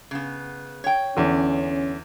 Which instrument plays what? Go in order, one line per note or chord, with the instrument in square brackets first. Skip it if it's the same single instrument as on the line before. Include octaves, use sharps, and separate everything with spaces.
[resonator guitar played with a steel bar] C#3 B3
C#5 G5
[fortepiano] E2 D3 [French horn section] C#4